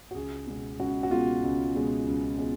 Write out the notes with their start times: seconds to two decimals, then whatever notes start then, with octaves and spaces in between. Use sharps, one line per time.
0.11 F#4
0.15 C#2 G#4
0.47 B2 G#3 B3
0.79 C#2 F#4
1.03 F#4
1.10 B2 G#3 B3 F4
1.43 C#2
1.75 B2 G#3 B3
2.07 C#2
2.38 G#3 B3